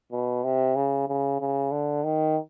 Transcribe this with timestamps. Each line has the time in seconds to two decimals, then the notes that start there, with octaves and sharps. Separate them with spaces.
0.12 B2
0.44 C3
0.76 C#3
1.08 C#3
1.40 C#3
1.72 D3
2.04 D#3